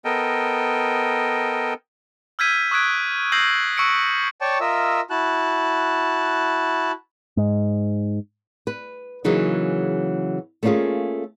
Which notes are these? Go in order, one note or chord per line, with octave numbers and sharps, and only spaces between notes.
B3 A4 A#4 D#5 G5
E6 F6 G6 G#6 B6 D#7
C#6 D#6 E6 F#6 G#6 D7
D#6 E6 G6 A#6 C7 F#7
C#6 E6 F#6 C#7 D7
C#5 D5 G5 A5 C#6
F4 A#4 D#5 E5 E6
E4 F#4 A5 F#6
G#2
B4
C#3 E3 F#3 A#3 D#4 G#4
A3 A#3 C#4 D4 F4 G#4